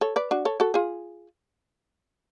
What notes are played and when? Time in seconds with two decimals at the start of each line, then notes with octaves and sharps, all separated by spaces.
0.01 A4 C#5
0.16 B4 D5
0.31 D4 F#4
0.45 A4 C#5
0.60 F#4 A4
0.74 F4 G#4